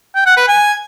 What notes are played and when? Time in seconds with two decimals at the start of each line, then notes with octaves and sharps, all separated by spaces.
0.15 G5
0.26 F#5
0.37 B4
0.48 G#5